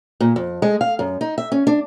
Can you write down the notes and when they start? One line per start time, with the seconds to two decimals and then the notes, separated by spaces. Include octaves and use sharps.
0.20 A#2
0.36 F2
0.62 G#3
0.81 F5
0.99 F#2
1.21 D#4
1.38 E5
1.52 C#4
1.67 D4